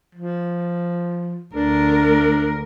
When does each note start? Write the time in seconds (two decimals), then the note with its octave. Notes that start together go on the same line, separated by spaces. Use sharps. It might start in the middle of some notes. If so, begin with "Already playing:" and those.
0.15 F3
1.55 D2 D4 A#4